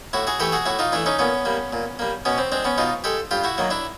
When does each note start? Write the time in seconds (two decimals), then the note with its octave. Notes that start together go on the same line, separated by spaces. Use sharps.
0.13 A2 E4 F#4
0.27 F#4 G#4
0.40 E3 A3 G4 A4
0.52 F#4 G#4
0.66 A2 E4 F#4
0.79 D#4 F4
0.92 E3 A3 D4 E4
1.06 C#4 D#4
1.19 A#2 B3 C#4
1.45 G3 A#3
1.73 A#2
1.99 G3 A#3
2.25 B2 B3 C#4
2.38 C4
2.52 G#3 C4 D4
2.65 B3 C#4
2.78 B2 D#4 F4
3.04 G#3 G4 A4
3.31 G2 F4 G4
3.44 E4 F#4
3.58 D#3 F#3 A#3
3.70 D4 E4